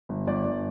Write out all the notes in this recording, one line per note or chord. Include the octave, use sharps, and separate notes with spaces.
G1
G1 D5
G1